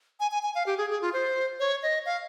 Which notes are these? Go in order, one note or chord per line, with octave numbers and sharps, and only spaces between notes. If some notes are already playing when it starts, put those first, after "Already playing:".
G#5
G#5
G#5
F5
G4
G#4
G#4
F4
C5
C#5
D#5
F5